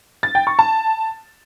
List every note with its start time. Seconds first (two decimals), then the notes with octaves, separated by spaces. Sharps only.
0.23 A6
0.35 G5
0.47 C#6
0.59 A5